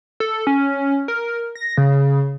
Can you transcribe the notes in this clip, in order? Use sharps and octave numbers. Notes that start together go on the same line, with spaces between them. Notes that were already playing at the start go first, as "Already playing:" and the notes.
A4
C#4
A#4
A#6
C#3